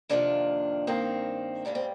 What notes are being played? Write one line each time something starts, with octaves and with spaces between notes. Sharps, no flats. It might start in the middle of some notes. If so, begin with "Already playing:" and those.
F2 C3 D#3 A#3 D4
G2 D#3 A#3 C4
G#2 G3 A#3 D4
C4